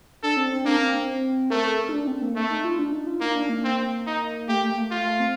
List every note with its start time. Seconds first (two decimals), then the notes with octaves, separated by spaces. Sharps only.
0.23 D4 A4
0.37 C4
0.52 C4
0.65 A#3 D4
0.77 C4
1.50 A3 A#4
1.65 A4
1.80 A#4
1.89 D#4
1.93 D4
2.07 C4
2.22 A#3
2.36 A3
2.50 D#4
2.64 F4
2.78 D4
2.93 D#4
3.07 F4
3.21 A#3 D#4
3.35 D4
3.49 A#3
3.64 C4
4.06 D#4
4.49 A3 G4
4.63 A#3
4.77 A3
4.91 A3 F4
5.05 A3
5.20 C4